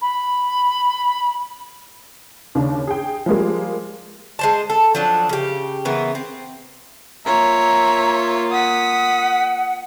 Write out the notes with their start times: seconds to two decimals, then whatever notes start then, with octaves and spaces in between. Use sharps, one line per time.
0.01 B5
2.55 D#2 C#3 D4
2.88 G#4 G5
3.26 F3 G3 G#3 A#3
4.39 G#3 C5 A5
4.70 A4
4.95 F3 F#3 D4
5.29 C#3 G4
5.85 C#3 E3 A#3 B3
6.15 C4
7.26 A#3 F4 C#5 E5 A#5
8.51 F#5 D#6 B6